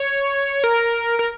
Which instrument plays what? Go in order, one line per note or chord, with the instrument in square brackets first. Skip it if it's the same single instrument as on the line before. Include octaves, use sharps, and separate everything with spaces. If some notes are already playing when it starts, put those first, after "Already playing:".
Already playing: [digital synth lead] C#5
A#4
A#4